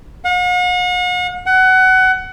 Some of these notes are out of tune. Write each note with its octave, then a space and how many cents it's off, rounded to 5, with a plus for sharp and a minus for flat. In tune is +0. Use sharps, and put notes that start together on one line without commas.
F#5 -45
F#5 +20